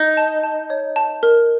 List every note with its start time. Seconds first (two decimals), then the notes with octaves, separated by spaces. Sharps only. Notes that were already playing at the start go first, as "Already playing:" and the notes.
Already playing: D#4
0.17 A5
0.44 A5
0.70 C#5
0.96 A5
1.23 A#4